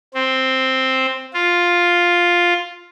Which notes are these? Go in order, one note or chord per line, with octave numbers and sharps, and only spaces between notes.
C4
F4